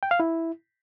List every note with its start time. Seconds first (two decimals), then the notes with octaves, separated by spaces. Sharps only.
0.03 G5
0.11 F5
0.20 E4